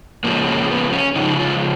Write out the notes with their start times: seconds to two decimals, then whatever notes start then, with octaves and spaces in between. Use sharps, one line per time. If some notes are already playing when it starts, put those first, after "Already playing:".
0.24 C#3 F3 G#3 A#3
0.47 A#3
0.71 B3
0.92 C#4
1.16 C#3 F3 G#3 D#4
1.39 F4